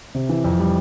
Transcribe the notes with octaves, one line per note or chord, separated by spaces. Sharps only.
C3
E3
F2
G3